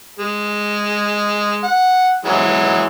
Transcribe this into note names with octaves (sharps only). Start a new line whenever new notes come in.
G#3
F#5
E3 F#3 G#3